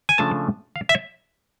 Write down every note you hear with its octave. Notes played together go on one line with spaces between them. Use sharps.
G#5
C#3 F3 A3 D4 A5
F5
E5